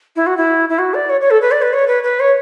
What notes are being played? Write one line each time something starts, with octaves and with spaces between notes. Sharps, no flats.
E4
F#4
E4
E4
F#4
D5
C#5
C#5
A4
B4
D5
B4
C#5
B4
B4
C#5